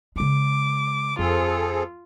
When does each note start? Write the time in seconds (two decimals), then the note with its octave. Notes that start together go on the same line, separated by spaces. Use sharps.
0.16 C#3 G#3 D6
1.19 F2 C4 F4 G#4 A4